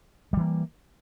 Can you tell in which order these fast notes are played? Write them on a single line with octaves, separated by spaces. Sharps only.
G3 E3 A#3